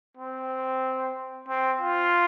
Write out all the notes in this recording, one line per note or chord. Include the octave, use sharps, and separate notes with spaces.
C4
C4
F4